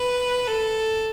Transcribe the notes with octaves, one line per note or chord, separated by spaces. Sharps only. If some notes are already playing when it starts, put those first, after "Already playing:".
Already playing: B4
A4